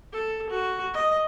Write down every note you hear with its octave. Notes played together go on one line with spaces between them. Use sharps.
A4
F#4
D#5